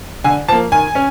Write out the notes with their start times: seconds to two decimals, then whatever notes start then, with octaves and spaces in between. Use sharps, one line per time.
0.24 D3 G#5
0.48 F3 A5
0.52 A#3
0.72 D#3 G#5
0.95 C#4